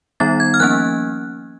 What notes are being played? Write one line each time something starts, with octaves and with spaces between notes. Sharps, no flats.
D#3 G3 B3 D#4 A6
G#6
F6
F3 A#3 C#4 F#6